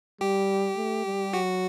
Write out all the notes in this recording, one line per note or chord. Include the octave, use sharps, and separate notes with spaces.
G3 G4
A3
G3
F#3 F#4